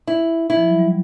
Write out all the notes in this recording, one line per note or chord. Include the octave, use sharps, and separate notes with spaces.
E4
E4
F3
F#3
G3